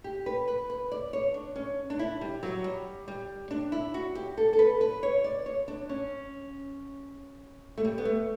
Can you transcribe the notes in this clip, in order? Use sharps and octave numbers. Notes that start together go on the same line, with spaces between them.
G4
B4
B4
B4
D5
C#5
D4
C#4
D4
E4
G3
F#3
G3
G3
D4
E4
F#4
G4
A4
A4
B4
B4
C#5
D5
C#5
D4
C#4
A3
G3
B3
A3